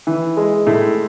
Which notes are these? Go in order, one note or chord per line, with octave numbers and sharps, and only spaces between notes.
E3
G#3
A2